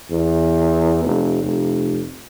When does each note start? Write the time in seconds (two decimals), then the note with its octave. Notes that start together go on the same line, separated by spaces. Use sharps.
0.10 E2
1.04 F1
1.43 F1